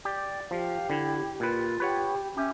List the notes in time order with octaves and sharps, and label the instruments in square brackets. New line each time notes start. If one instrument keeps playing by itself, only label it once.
[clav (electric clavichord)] G4 [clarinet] D5
[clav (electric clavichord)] F3 [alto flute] G4 [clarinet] F5
[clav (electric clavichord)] D3 [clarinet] E4
[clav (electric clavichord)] A#2 B4 [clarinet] F4
[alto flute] G4 [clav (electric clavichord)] B4 C#5 F#5
[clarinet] C#4 [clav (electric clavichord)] G4 [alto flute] E5